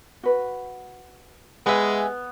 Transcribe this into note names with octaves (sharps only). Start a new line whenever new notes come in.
F#4 B4
G#3 B3 G#4 E5